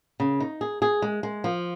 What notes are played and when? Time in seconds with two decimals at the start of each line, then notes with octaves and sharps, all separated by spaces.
0.20 C#3
0.40 D#4
0.61 G#4
0.82 G#4
1.02 G#3
1.23 G#3
1.44 F3